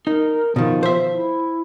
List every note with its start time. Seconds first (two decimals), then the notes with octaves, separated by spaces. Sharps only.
0.07 D#4 A#4
0.56 B2 D#3 F3
0.83 C5 E5
1.13 E4